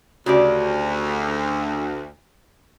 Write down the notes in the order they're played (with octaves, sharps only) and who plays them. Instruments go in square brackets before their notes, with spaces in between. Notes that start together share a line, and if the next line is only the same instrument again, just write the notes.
[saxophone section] D2 [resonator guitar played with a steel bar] C#3 G4 D5 [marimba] F#4